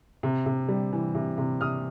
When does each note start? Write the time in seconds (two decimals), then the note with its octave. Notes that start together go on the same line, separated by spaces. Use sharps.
0.23 C3
0.46 C3
0.69 G3
0.93 E3
1.15 C3
1.38 C3
1.61 C3 D#6 F6